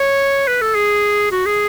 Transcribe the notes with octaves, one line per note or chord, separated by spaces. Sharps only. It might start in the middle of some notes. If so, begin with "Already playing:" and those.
Already playing: C#5
B4
A4
G#4
F#4
G#4